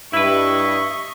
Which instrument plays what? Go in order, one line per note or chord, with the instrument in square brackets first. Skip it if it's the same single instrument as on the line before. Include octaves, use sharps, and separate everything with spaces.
[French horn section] G2 [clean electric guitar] E4 B4 [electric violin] D#5 C#6 [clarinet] E5